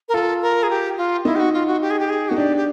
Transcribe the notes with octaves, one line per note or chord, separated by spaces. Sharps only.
A#4
F4 A4
A#4
G#4
G4
F4
D#4 E4
G4
F#4
F4
F#4
G4
G#4
G4
G#4
D#4 F#4
D4 G4
G4